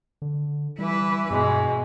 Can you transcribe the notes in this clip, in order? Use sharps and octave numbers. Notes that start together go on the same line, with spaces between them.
D3
E3 G3 E4 B4
G2 B2 G#3